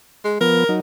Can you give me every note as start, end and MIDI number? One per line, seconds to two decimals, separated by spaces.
0.24 0.37 56
0.41 0.64 53
0.41 0.64 59
0.41 0.77 70
0.69 0.80 54
0.69 0.80 63